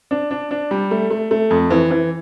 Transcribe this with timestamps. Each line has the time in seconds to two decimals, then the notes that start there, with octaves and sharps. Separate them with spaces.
0.11 D4
0.31 D4
0.51 D4
0.71 G3
0.91 A3
1.11 A3
1.31 A3
1.51 F2
1.70 E3
1.91 E3